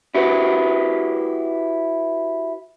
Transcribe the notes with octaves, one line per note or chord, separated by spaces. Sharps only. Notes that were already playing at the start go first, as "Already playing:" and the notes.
E4 F#4 G4 B4